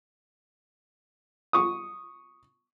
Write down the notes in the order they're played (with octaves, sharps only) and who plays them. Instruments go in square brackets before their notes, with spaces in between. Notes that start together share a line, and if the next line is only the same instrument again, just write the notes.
[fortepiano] C#6 D#6